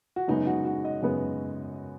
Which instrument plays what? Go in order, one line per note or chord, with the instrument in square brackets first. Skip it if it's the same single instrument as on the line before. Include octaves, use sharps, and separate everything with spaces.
[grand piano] F#4
[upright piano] F#2 C#3 G#3 B3 [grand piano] D#4
[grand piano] F#4
F#4
D#5
[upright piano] F#2 C#3 G#3 B3